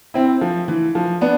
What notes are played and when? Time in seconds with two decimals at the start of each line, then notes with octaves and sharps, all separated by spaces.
0.14 C4 E4
0.41 F3
0.68 E3
0.95 F3
1.21 B3 D4